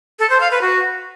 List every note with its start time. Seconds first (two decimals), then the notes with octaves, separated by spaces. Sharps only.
0.19 A4
0.30 C5
0.40 F5
0.51 B4
0.61 F#4